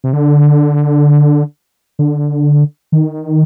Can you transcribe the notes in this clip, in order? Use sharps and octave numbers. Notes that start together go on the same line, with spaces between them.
C3
D3
D3
D#3